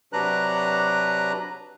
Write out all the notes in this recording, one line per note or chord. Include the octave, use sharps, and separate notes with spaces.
C3 F#3 D4 B4 A#5 F#6